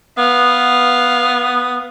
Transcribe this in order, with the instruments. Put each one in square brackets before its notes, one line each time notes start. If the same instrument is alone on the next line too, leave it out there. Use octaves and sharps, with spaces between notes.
[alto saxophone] B3 [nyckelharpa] F5